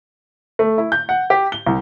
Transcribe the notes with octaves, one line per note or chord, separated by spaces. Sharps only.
A3
E4
G6
F#5
G4
G7
C2